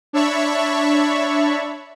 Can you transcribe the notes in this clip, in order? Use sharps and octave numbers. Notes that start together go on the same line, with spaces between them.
D4 C#5 E5 A5 B5 C#6